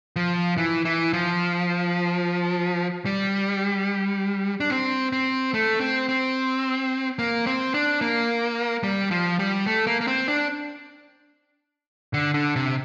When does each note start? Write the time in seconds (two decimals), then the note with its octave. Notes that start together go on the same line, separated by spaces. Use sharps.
0.16 F3
0.58 E3
0.85 E3
1.13 F3
3.06 G3
4.60 D4
4.70 C4
5.13 C4
5.54 A3
5.80 C4
6.09 C4
7.19 A#3
7.47 C4
7.74 D4
8.01 A#3
8.83 G3
9.11 F3
9.39 G3
9.66 A3
9.87 A#3
10.01 A#3
10.07 C4
10.28 D4
12.14 D3
12.34 D3
12.56 C3